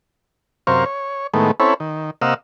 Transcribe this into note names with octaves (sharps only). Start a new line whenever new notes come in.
F#2 C3 A#4 C5 F5 C#6
C#5
A2 D#3 G#3 A3 B3
C4 C#4 E4 A4 C#5 B5
D#3
C3 A#3 D#5 F5 F#5 E6